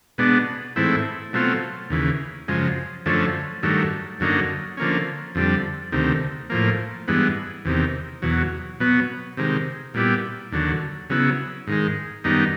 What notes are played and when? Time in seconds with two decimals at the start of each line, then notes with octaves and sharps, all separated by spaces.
0.18 B2 G#3 B3 D4
0.76 G#2 E3 A3 C4 E4
1.33 B2 F#3 A3 C4 F4
1.90 D#2 C#3 E3
2.48 F#2 C#3 F3 G#3
3.06 F#2 D3 F3 A3 C#4
3.63 G2 D#3 F#3 A3
4.20 F#2 D3 F#3 A#3 D#4
4.77 D3 F3 A#3 C#4
5.35 F2 D3 G3
5.92 D2 C3 D#3
6.50 A2 F3 A#3
7.08 G2 E3 G#3 B3
7.65 E2 C3 D#3
8.22 E2 B2 F#3
8.80 B2 F#3 B3
9.37 C3 D#3 G#3
9.94 A#2 G3 B3 E4 G4
10.52 D#2 D3 F#3
11.10 C#3 F#3 B3 E4
11.67 G#2 D#3 G#3
12.24 F#2 D#3 G3 B3 D#4